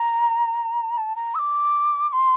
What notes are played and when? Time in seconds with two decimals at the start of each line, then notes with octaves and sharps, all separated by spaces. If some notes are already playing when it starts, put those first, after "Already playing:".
Already playing: A#5
0.97 A5
1.16 A#5
1.35 E6
1.39 D6
2.09 D6
2.13 C6